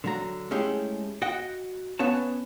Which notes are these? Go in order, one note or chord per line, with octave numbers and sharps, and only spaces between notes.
D3 F#3 A#5
G#3 A3 C#4 E4 G4 G#4
F#4 D#5 F#5 G5
B3 C#4 B4 C#5 A5